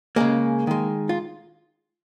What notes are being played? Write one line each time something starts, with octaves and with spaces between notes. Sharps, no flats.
C#3 G#3 A#3
D#3 G#3
F4